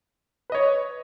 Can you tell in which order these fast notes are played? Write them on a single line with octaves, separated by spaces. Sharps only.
B4 D#5 C#5